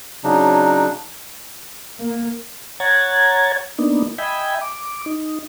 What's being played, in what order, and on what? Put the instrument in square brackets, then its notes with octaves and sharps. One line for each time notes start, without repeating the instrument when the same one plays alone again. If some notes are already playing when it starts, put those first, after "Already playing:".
[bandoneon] C#3 F#3 D4 D#4
[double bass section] A#3
[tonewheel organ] C#5 F#5 A#5 G#6 A6
A#3 B3 D4 D#4
D#5 E5 G5 G#5 B5
D6
D#4